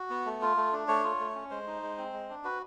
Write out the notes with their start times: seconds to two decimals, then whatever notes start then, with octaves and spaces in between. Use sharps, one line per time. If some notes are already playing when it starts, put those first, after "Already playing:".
Already playing: F#4
0.10 B3
0.26 A3
0.42 F4
0.57 A3
0.72 D4
0.88 A3 C#5
1.04 F4
1.20 A3
1.35 C#4
1.50 G#3 C5
1.67 D#4
1.82 G#3
1.98 C4
2.13 G#3
2.29 D4
2.44 F#4 B4